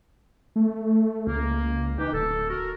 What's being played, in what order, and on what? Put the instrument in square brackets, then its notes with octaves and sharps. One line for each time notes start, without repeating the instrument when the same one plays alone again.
[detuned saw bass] A3
[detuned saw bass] C#2 [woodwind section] A#3
[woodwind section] E3 G4 [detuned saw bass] D#4
[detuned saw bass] D1 [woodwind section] A4
[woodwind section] F#4 A4 A#4